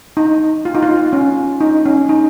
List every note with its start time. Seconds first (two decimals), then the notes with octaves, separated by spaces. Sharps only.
0.17 D#4
0.65 F4
0.75 D#4
0.82 F4
1.13 C#4
1.61 D#4
1.86 C#4
2.09 D#4